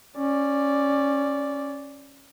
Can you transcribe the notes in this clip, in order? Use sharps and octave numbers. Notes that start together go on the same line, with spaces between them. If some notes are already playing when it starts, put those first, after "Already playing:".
C#4 D5